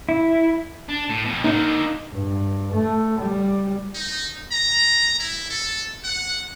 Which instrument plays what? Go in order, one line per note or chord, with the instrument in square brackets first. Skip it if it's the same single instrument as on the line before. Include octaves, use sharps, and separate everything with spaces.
[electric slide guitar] E4
[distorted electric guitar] D4
A2
F2 B2
[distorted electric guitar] D3 A#3 [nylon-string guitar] D#4 D#5
[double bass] G2
A3
G3
[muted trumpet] D#4
A#5
E4
A4
F#5